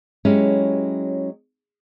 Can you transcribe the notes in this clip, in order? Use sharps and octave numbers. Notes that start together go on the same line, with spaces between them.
F#3 G#3 C#4 E4 G4